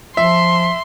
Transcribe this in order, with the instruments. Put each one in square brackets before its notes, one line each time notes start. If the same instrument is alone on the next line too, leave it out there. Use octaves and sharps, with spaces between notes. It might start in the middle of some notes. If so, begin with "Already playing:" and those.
[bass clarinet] F3 [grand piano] E5 [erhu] C6